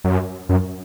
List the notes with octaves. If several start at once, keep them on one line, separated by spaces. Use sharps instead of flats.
F#2
F#2